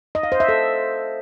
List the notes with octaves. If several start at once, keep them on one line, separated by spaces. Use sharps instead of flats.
D#5
F5
C5
E5
A4